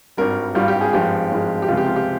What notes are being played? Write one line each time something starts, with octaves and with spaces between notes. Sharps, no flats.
G#1 G2 G3 A#4
G#1 G2 G3 F4
G4
G#4
G#1 G2 F3 G#3 G4
G#1 G2 F3 G#3
G4
C#2 C3 F3 G#3 F4
G4
F4
G4